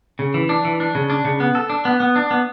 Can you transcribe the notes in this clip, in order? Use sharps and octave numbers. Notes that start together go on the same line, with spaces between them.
C#3
E3
D4
E3
D4
C#3
D4
C#3
B3
A4
D4
B3
B3
D4
B3